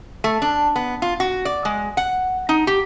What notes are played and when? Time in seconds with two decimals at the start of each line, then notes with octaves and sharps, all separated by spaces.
0.24 A3
0.42 D4
0.76 B3
1.02 F4
1.20 F#4
1.45 D5
1.65 G#3
1.97 F#5
2.49 D#4
2.67 G4